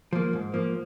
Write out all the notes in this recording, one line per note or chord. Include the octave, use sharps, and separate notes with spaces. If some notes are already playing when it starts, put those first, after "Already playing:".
F3 A#3
G#2
F3 A#3